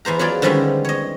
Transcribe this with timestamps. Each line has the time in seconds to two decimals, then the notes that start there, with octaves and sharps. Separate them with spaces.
0.05 E2 B3 C5 A#5
0.19 F#3 B3 F4 G#4 D5
0.42 D3 D#3 F3 G3 G#3 C#4
0.85 C#5 D#5